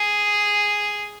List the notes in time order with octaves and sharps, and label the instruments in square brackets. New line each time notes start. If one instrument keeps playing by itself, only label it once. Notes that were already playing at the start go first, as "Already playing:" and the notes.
Already playing: [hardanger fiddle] G#4